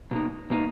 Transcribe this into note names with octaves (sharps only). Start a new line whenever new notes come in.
B2 A#3 D#4
B2 A#3 D#4